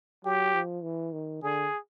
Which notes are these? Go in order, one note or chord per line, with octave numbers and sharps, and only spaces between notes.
F#3 G4
F3
E3
D#3
D3 G#4